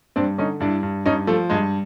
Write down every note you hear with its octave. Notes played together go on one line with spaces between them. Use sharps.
G2 C4 D4
D3 C#4 D#4
G2 D4 E4
G2
G2 C#4 D#4
F3 A3
G2 G#3